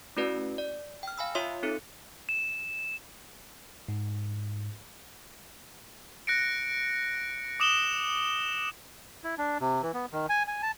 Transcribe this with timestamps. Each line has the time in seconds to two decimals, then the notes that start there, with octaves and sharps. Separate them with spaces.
0.17 A3 C#4 E4 F#4 B4 D5
0.58 D5
1.03 G5 F6
1.18 F5 G#5 B5 E6
1.35 F4 C#5 E5 C6 D#6
1.63 C4 D#4 A4 C#7
2.29 E7
3.88 G#2
6.27 F#6 A#6 C#7 D7
7.60 D6 D#6 E7 F#7 G7
9.24 E4
9.38 D4
9.61 C3
9.83 E3
9.94 B3
10.12 D#3
10.29 G#5
10.48 G#5
10.63 A5